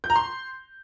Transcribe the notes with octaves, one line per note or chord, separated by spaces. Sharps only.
G6
A#5
C6